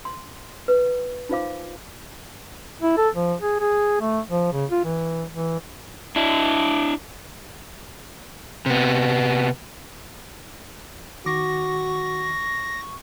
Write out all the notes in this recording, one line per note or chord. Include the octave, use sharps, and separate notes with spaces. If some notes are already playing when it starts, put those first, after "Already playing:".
C6
B4
D#4 F4 C5 F5 D6
E4
A4
F3
G#4
G#4
A3
F3
C#3
F4
E3
E3
D4 E4
C3 B3
D#3 F#4 C#6 D6 A#6